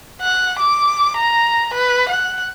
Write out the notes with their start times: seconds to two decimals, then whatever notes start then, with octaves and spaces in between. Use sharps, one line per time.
0.21 F#5
0.60 D6
1.17 A#5
1.74 B4
2.09 F#5